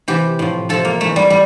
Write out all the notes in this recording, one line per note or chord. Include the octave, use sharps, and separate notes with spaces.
C3 E3 G4
A2 F3
C3 F3 A4
A#3
C3 E3 A3
G3
G3